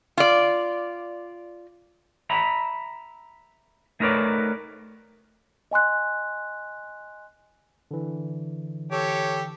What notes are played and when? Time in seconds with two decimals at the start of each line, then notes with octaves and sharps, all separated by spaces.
0.17 F4 D5
2.30 E5 A#5 B5
4.00 A3 D#4 A#4 B4 C#5 D5
5.71 D#5 G#5 C6 F#6
7.91 D3 E3
8.92 G4 A4 C#5